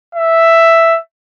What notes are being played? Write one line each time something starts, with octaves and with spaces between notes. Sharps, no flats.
E5